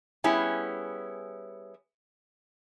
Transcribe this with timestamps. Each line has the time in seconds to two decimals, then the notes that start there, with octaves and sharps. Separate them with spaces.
0.24 G3 B3 C#4 E4 G#4